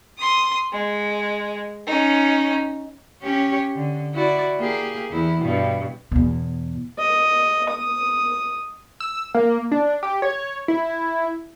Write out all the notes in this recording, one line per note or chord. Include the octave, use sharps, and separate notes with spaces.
C6 D#6
G#3
C#4 D#4
C#4 G4 C#5
D3
E4 F#4 D5
A#3 G4 G#4
E2 E4
G2 B2
E2 B2
D#5
D#6
E6
A#3
D4
G4
C#5
E4